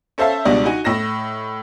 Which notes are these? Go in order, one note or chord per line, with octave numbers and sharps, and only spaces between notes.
C#4 A4 C5 E5 F5 A5
C#2 B2 G3 D4 D#5
D#4 F#4 G#5
A2 D#5 A#6 E7